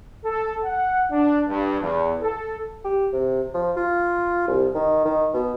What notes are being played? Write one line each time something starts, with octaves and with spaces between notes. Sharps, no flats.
A4
F#5
D4
G2
E2
A4
G4
C3
F3
F4
C2
D#3
D#3
B2